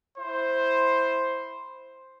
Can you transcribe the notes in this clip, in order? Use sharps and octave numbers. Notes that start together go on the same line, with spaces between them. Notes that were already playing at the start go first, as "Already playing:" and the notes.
E4 C5